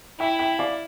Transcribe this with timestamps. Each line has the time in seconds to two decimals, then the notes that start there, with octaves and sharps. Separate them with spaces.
0.20 E4 E5 G5
0.39 E5 G5
0.59 D5 F5